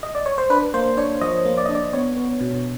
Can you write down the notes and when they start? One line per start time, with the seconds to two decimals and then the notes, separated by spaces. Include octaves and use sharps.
0.03 D#5
0.15 D5
0.26 C#5
0.38 C5
0.50 D4 B4
0.74 A#3 C5
0.97 D4 C#5
1.21 F3 D#5
1.45 A#3
1.57 D5
1.66 D4 D#5
1.75 D5
1.93 B3 C#5
2.16 B3
2.41 B2